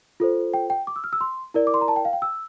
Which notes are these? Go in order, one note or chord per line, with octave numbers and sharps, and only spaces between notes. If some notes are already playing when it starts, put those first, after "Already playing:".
F4 A4 C5
G5
G5
D6
E6
F6
E6
C6
E4 A#4 D5
D6
C6
A#5
A5
G5
F5
G5
E6